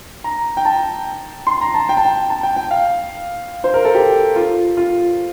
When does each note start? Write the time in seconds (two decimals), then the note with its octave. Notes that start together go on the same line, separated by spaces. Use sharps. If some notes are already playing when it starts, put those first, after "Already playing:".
0.24 A#5
0.57 G5
0.65 A5
1.47 C6
1.61 A#5
1.74 A5
1.89 G5
1.97 A5
2.05 G5
2.30 A5
2.43 G5
2.56 G5
2.71 F5
3.64 C5
3.74 A#4
3.84 A4
3.95 G4
4.36 F4
4.77 F4